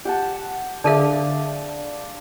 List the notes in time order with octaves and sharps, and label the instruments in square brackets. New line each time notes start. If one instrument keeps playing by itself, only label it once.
[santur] G4 F#5 A5
[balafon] D3 G#4 E5 [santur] D4 D5 F5